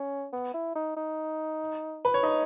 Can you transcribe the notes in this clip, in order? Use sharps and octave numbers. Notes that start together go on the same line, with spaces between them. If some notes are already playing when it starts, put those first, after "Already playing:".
Already playing: C#4
B3
E4
D#4
D#4
B4
C#5
D#4 D#5